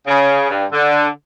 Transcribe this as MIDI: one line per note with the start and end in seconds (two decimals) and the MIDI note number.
0.07 0.48 49
0.51 0.65 43
0.72 1.07 50